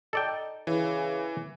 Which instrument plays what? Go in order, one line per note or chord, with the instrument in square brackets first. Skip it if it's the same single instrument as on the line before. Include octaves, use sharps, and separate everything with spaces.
[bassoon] D#4 [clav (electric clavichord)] A4 D5 G5
[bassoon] C#3 [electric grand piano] E3